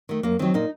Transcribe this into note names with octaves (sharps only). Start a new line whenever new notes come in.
D#3 A3
F#2 A#3
D#3 F#3 C4
A#2 D#4